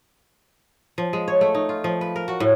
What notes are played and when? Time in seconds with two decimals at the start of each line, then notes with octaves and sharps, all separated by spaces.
0.98 F3
1.13 G#3
1.28 C#5
1.41 A3
1.55 D#4
1.69 F4
1.84 F3
2.01 B4
2.16 A#4
2.28 F#4
2.40 A2